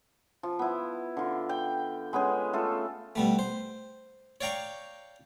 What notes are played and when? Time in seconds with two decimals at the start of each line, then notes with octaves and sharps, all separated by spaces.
0.43 F3
0.59 B3 E4
1.17 D3 F4
1.49 G5
2.13 G#3 B3 C#4 G#4
2.53 A3 F4 A4
3.15 B2 G3 A3
3.39 C5
4.41 C#5 D5 F5 G5 A#5 C#6